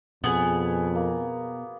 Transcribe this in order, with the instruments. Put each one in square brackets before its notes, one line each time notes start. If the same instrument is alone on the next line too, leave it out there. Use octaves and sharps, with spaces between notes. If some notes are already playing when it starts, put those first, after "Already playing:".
[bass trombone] F2 [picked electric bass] B2 [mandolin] B3 G#4
[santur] A#3